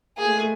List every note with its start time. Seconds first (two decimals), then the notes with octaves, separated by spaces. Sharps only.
0.17 A#3 G#4
0.24 A3
0.32 G#3
0.39 A3